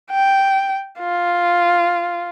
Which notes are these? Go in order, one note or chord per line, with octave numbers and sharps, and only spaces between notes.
G5
F4